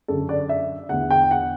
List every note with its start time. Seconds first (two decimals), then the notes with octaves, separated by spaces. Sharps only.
0.08 F#2 D3 A4
0.29 D5
0.49 E5
0.89 E2 D3 F#5
1.11 G5
1.31 F#5